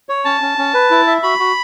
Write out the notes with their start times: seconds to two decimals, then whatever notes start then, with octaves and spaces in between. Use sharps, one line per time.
0.09 C#5
0.25 C#4 A5
0.42 C#4
0.58 C#4
0.74 B4
0.91 E4
1.07 E5
1.23 F#4 B5
1.39 F#4